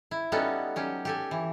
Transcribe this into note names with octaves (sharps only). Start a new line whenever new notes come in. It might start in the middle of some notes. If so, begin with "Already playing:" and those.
E4
G3 B3 C#4 D#4 F#4 A4
F#3 C#4 G4
G4 A4 G#5
E3